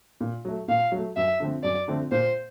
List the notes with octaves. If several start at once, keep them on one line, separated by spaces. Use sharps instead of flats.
A#2
F#3 A3
A#2 F5
F#3 A3
F#2 E5
D3 F3 A3 C4
F#2 D5
D3 F3 A3 C4
A#2 C5